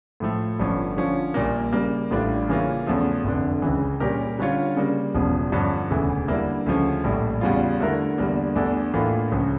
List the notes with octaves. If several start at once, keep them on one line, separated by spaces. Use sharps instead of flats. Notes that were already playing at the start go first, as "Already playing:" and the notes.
A2 F3 A3
G1 G2 F3 C#4
D3 F3 C#4 F4
A#1 A#2 G3 A#3
C#3 G3 A#3
A1 A2 G3 D4 F4
C#3 E3 A#3 C#4 F4
E2 C#3 F3 A3
F1 F2 D3
C#2 C#3 E3
A#2 G3 C#4 G4 A#4
D3 G3 C#4 F4 C#5
C#3 G3 A#3
E1 E2 C#3 F3
G2 D3 F3 C#4
E1 D2 C#3 E3
D3 G3 A#3 E4
D2 C#3 F3 C#4
A#1 A2 G3
E2 C#3 G3 C#4 F4
D3 A3 E4 A#4
E2 D3 G3 A#3
E2 E3 A3 D4 A4
A2 E3 A#3 D4 F4
C#2 C#3 F3 C#4